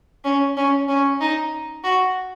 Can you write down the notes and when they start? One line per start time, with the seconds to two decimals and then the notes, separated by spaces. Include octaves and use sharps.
0.25 C#4
0.57 C#4
0.88 C#4
1.21 D#4
1.84 F#4